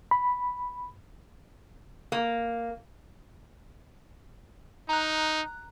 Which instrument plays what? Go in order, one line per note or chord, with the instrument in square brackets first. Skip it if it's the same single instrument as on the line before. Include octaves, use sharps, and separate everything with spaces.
[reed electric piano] B5
[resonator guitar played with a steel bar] A#3
[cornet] D#4 [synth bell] A#5 F#6